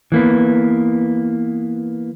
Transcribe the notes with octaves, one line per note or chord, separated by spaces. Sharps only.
E3 A#3 B3